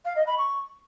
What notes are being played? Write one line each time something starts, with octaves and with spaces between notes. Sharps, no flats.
F5
D#5
B5
C#6